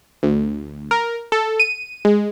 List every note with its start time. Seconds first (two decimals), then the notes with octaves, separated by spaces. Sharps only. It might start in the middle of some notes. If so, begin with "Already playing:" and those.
0.23 D2
0.91 A#4
1.32 A4
1.60 D#7
2.05 G#3